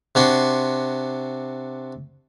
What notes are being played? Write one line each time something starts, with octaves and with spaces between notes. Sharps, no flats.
C3 D4 F#4 C6